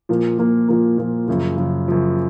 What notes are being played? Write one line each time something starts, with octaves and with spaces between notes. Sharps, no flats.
A#2 F3 A#3
A#2 F3 A#3
A#2 F3 A#3
A#2 F3 A#3
F#2 C#3 F3
F#2 C#3 F3
F#2 C#3 F3